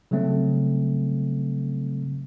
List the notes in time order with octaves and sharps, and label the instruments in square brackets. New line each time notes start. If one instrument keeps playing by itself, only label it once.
[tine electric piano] C#3 F#3 G3 A3 C4